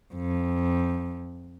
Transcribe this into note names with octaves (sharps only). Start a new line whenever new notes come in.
F2